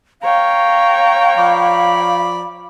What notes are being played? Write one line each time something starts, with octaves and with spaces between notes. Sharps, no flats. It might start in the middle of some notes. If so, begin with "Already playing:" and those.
C#5 F5 G5 A#5
F3 D5 B5